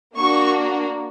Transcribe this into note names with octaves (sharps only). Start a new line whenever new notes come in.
A#3 D4 F#4 C#6